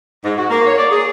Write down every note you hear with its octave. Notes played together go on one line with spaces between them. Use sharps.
G#2
F#4
A#3
C#5
D5
G#4